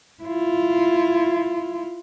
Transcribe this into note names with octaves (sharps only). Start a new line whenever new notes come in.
E4 F4